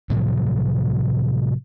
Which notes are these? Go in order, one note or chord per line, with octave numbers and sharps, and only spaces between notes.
A2 C3 F3 F#3